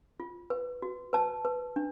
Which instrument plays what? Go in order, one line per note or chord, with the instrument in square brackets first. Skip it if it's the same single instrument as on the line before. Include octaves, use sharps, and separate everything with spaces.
[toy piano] F4
B4
F#4
B4 A5
B4
D4